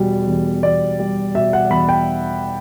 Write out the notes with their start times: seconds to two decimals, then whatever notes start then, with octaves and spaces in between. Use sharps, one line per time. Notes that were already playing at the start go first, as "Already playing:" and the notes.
Already playing: E2 B2 G3
0.27 E2
0.63 E2 D5
1.00 G3
1.34 B2 E5
1.53 F#5
1.70 E2 B5
1.89 G5